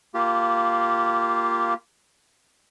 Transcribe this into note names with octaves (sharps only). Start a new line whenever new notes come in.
A#3 F4 G4